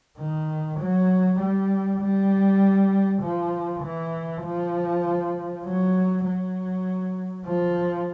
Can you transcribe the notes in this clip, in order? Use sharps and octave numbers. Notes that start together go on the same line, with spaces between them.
D#3
F#3
G3
G3
F3
E3
F3
F#3
F#3
F3